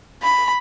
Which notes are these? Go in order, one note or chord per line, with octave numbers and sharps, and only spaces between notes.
B5